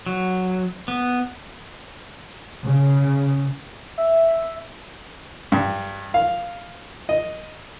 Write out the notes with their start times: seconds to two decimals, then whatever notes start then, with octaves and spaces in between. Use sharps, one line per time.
0.06 F#3
0.88 B3
2.63 C#3
3.98 E5
5.52 G2
6.14 F5
7.09 D#5